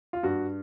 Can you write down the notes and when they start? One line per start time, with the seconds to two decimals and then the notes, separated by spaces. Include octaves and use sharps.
0.13 F4
0.23 G2 F#4